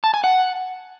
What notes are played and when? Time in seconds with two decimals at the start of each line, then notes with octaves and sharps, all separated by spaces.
0.04 A5
0.14 G#5
0.24 F#5